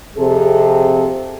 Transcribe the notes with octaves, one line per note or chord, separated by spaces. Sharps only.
F2 C3 G#4 A4